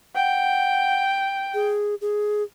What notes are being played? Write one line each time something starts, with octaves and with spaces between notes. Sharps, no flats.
F#5 G5
G#4
G#4